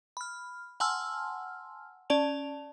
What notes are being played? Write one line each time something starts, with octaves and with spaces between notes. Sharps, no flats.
B5 F6
F#5 G#5 A5 C6 E6 F6
C#4 D5 A5 F7